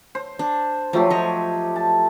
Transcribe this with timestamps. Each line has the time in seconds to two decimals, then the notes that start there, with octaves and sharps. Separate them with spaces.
0.15 C5
0.39 D4
0.93 F3 F#3 A3 G4
1.10 C#5 D#5
1.76 A5